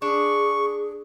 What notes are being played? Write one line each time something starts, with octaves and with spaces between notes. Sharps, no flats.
D4 G#4 C#6